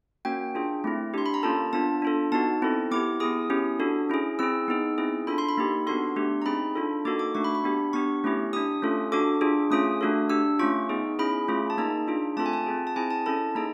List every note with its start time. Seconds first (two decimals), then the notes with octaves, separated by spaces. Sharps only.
0.25 A#3 C#4 F#4 G5
0.55 D4 F4 G#4
0.84 A3 C4 E4
1.14 D4 G4 C6
1.26 B5
1.34 A#5
1.43 A#3 C#4 F4 A4 A5
1.73 B3 D4 F4 A5
2.02 D4 F4 A4
2.32 B3 D#4 F#4 A5
2.62 C4 E4 A4
2.91 B3 E4 G4 D6
3.20 B3 E4 G#4 D#6
3.50 C#4 E4 G4
3.80 D4 F#4 A4
4.09 C#4 E4 G#4
4.39 C4 E4 G#4 E6
4.68 B3 D#4 G#4
4.98 C4 E4 G#4
5.27 D4 F4 A4 B5
5.38 C6
5.49 B5
5.57 A#3 D#4 G4
5.87 B3 D4 F#4 A4 C6
6.16 A3 D4 G4
6.42 A#5
6.46 C4 D#4 G#4 B5
6.75 D4 F4 A4
7.05 A#3 D#4 F#4 A4 D6
7.19 D6
7.35 A3 D4 F#4 C#6
7.44 B5
7.55 B5
7.64 B3 D4 G4
7.93 B3 D4 G4 C#6
8.24 A3 C#4 E4 G4
8.53 D4 G4 D#6
8.82 A3 C#4 F4 A4
9.12 D4 F#4 A4 D6
9.41 D4 F4 G#4
9.70 A3 C#4 F4 G#4 D#6
10.01 A3 D4 F#4 A4
10.30 D4 G4 E6
10.59 A3 C#4 F4 C#6
10.89 B3 D#4 G#4
11.19 C#4 E4 G#4 B5
11.48 A3 C#4 F4 G#4
11.70 A5
11.78 A#3 D#4 G#4 A#5
12.08 D4 F4 G#4
12.37 A3 C4 F4 A4 A5
12.46 G#5
12.53 A5
12.66 C4 F4 G#4
12.87 A5
12.96 C4 E4 G#4 G#5
13.10 A5
13.26 C#4 E4 A4 A5
13.55 A#3 D#4 G#4 A#5